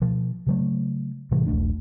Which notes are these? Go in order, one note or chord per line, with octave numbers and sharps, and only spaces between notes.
B2 F3
C#3 F#3 A3
A2 C3 E3 G3
D#1 A#1 A3 D4